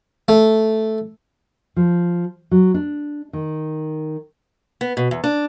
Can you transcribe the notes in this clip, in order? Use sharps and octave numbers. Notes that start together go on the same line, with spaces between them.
A3
F3
F#3
D4
D#3
B3
B2
E2
D4